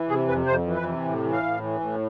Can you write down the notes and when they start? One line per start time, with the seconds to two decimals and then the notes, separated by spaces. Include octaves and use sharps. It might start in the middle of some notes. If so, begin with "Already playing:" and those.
Already playing: E3
0.09 C3 G#4
0.28 F2 B4
0.46 F2 C5
0.66 E3
0.76 B4
0.85 C3
1.04 A2
1.24 E3
1.33 F5
1.43 A2
1.61 E3
1.80 A2